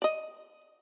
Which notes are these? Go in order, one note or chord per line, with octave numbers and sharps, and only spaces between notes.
D5 D#5